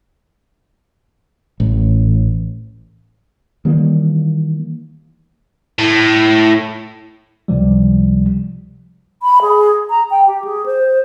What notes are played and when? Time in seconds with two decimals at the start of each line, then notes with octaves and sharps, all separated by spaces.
1.60 A1
3.65 D#3 E3 G3 A#3
5.79 A2
7.48 C#2 C3 F3 G3
9.23 B5
9.42 G#4
9.90 A#5
10.11 G5
10.27 G4
10.44 G#4
10.66 C5